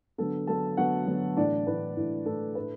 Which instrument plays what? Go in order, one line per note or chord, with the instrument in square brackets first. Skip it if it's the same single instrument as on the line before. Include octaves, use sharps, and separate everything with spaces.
[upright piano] D3 F#3 B3 A4
D3 F#3 B3 A4 A5
D3 F#3 B3 F#4 F#5
D3 F#3 B3
A2 E3 D4 D5
A2 E3 D4 B4
A2 E3 D4
A2 E3 D4 A4
A2 A3 D4 B4